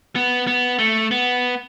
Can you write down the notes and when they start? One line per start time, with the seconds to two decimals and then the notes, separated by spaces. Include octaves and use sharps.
0.16 B3
0.47 B3
0.79 A3
1.11 B3